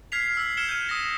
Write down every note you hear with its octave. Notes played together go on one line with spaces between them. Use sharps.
F6 G#6 B6 C7 F7
E6 B6 C7
F6 G#6 C#7 E7 G7
G6 D#7
D#6 A#6